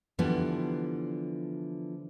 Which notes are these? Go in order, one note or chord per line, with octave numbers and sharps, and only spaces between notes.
D3 E3 F3 G3 B3